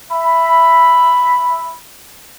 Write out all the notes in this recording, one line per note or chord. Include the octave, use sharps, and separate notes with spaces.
E5 B5